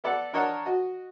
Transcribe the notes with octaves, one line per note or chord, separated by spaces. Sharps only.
B3 A4 D5 F#5
D4 A#4 C#5 D#5 F#5 A5
F#4 D#5